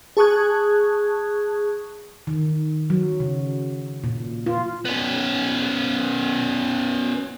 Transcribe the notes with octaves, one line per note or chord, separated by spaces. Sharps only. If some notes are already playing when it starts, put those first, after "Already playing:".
G#4 A5 C#6 D#6 F#6 G#6
D#3
F#3
C#3
A#2
F4
B3 C#4